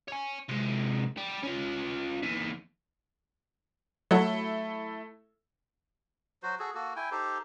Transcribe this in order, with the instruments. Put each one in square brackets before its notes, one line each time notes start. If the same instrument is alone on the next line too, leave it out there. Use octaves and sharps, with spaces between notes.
[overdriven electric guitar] C#5 G#5
C3 G#3
G3
C#4 F4
D#2 E3
[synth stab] F#3 [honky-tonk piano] A3 E4 A4
[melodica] F#3 F#4 C5
F#4 G#4 A4
A#3 F#4 A4
E4 G5 G#5
D#4 G4 A4 C5